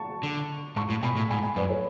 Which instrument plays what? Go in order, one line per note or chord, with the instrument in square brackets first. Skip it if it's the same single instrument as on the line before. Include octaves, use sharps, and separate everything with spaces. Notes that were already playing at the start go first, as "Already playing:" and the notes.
Already playing: [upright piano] A5 C#6
[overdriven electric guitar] D3
[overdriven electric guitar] G#2 [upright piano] A5 C#6
[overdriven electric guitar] A2
[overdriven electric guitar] B2 [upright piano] G#5 B5
[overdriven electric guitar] A2
[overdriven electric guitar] G#2 [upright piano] G#5 B5
[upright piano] G#5 B5
[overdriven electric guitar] F#2 [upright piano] B4 D5
[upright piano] A4 C#5